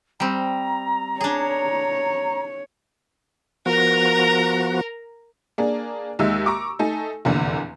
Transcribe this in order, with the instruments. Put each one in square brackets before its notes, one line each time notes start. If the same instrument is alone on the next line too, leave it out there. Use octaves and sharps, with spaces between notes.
[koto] G3 C4 [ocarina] A#5
[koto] D4 G#4 [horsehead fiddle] C#5
[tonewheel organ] F3 B3 F#4 [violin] A#4 A#5
[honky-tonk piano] A#3 D4 G#4
D#2 G#3 D#4 E5 E6
A#5 C#6 D6
A3 D#4 A4 G#5
F1 E2 A#2 D3 E3